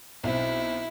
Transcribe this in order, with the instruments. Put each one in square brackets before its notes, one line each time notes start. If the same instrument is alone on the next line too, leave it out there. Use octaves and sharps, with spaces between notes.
[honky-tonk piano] B1 C4 [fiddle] E4